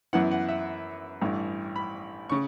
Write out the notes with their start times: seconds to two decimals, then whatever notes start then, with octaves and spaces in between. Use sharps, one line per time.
0.13 F#2 E3 B3 E4 F#5
0.31 F#5
0.48 E5
1.21 A1 G2 E3
1.76 B5
2.30 C#3 C#6